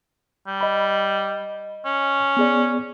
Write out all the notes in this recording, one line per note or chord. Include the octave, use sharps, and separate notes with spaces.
G3
D#5 B5
C#4
B3 G#4 D5